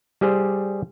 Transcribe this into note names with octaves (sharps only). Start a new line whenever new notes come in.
G3 G4 G#4 C5